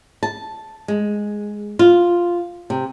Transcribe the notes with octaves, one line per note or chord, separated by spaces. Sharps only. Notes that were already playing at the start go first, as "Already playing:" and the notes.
A5
G#3
F4
C3